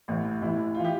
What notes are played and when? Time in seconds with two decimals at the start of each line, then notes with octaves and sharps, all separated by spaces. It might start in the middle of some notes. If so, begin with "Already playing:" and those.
0.08 A1 A2 E3
0.41 A1 A2 E3 E4
0.74 F4
0.80 E3 G4